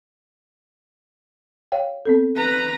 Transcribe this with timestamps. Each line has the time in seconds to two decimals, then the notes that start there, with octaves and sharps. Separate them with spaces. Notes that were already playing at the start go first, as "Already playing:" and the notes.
1.72 C#5 F5 G5
2.05 B3 C4 A4
2.36 B4 A#5